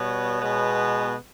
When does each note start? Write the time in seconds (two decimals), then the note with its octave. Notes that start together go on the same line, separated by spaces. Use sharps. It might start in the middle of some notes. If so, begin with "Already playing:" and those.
Already playing: B2 G3 B3 C#5
0.40 B2 G#3 B3